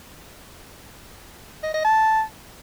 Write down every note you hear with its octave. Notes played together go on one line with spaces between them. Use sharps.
D#5
D#5
A5